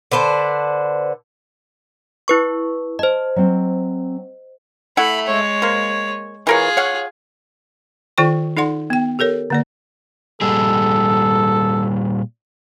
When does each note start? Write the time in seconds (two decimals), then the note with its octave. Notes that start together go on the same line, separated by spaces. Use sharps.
0.12 D3 B4 C5 A5
2.28 E4 B4 C#6
2.99 C5 D#5 A5
3.36 F#3 C4
4.97 A3 E4 F#5 B5
5.27 G#3 C#5
5.62 A#3 C5
6.47 E3 F4 G#4 A#4 C#5
6.77 C#5 F5 F#5
8.18 D#3 F4 A4 D5 G5 C#6
8.57 D#4 A4 D5 F#5 C6
8.90 B3 G5
9.19 G4 A4 A#4 C#5
9.50 D3 A#3 D5
10.41 A#2 G3 G#4 A4